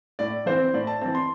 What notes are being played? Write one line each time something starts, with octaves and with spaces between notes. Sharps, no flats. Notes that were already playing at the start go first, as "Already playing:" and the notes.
A2 D5
E3 C4 C5
A2 D5
A5
E3 C4 A5
C6